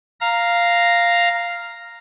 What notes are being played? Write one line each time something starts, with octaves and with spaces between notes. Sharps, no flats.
F5 A#5